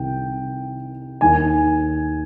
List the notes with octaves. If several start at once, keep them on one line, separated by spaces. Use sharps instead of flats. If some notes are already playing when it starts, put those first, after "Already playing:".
Already playing: C2 C3 D#3 G5
D#2 D#3 G#5